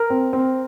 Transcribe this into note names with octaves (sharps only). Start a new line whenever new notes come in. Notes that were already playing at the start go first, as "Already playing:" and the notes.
Already playing: A#4
C4
C4